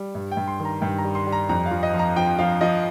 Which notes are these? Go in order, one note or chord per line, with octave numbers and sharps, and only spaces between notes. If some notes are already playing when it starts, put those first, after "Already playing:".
Already playing: G3
G2
G5
G2
C6
D#3
A#5
G2 G5
A#5
G3
C6
G3
A#5
F2 A#5
F5
F3
D#5
F3 A#5
F3 G5
F3 F5
F3 D#5